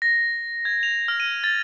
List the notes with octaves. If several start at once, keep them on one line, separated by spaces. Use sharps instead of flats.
A#6
G#6
F7
F6
D#7
A6